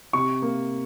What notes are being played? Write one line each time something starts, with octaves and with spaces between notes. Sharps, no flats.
C3 C#6
A#3